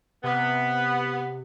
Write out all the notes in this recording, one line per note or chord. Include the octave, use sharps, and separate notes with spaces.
C3 B3